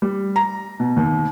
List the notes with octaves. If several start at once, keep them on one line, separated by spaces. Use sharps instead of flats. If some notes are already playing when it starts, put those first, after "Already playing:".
G3
A#5
B2
D#2